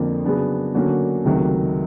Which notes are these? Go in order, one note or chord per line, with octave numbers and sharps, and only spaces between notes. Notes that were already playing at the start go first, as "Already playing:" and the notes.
Already playing: F2 D3 F3 A#3
C#3 F#3 B3 D4
D3 F#3 A#3 C#4 F#4
C#2 C3 D#3 F#3 A3